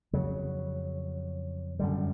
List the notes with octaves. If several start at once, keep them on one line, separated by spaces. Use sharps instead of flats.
F2 C#3 F#3
F#2 D3 G3